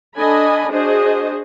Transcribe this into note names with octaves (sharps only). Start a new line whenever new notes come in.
D4 A4 D#5 G#5 B5
D4 F#4 G#4 C5 D#5